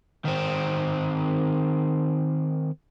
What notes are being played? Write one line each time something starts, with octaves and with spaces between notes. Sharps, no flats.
D#3 C4